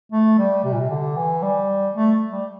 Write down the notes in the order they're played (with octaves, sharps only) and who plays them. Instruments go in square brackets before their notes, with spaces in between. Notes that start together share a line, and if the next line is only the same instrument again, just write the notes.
[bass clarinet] A3
G3
C3
A#2
C3
D3
E3
G3
A3
G3